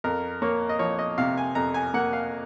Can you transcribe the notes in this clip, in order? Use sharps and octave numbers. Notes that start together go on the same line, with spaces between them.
F2 A#4
A#3 C#5
D#5
F3 C#5
D#5
C3 F5
G#5
F2 A#5
G#5
A#3 F#5
F5